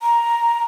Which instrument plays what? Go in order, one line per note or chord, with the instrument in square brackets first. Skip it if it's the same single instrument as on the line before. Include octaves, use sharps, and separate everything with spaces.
[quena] A#5